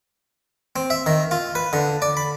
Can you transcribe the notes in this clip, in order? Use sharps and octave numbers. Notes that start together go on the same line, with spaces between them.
C4
E5
D#3
F4
B4
D3
D5
B5